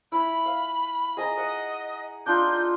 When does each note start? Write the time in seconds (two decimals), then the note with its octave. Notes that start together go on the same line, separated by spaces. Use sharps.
0.12 E4 B5
0.46 F5
1.17 G#4 D#5 A#5
1.37 F#5
2.26 D4 D#4 F4 G6